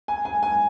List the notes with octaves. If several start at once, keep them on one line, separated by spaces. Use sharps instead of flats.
G#5
G#5
G#5